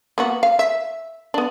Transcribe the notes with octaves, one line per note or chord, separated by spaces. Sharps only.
A#3 B3 F#4
F5
E5
B3 D4